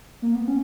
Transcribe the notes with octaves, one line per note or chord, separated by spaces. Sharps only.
A#3
B3
C#4